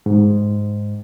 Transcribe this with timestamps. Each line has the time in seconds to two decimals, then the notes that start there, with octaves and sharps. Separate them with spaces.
0.06 G#2